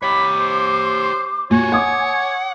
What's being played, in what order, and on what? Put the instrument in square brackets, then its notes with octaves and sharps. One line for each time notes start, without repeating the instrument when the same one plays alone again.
[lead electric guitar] G4 C#5 [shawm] B5 [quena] D6
[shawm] C5
[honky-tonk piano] A#2 [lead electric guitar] F4 F#4 [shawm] C#5 [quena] G#5
[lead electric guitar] F#5 [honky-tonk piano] D6 D#6 G#6